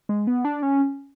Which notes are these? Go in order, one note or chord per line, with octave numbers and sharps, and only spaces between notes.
G#3
B3
D4
C#4